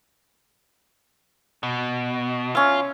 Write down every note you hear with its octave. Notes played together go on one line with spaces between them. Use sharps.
B2
C#4 F4 E5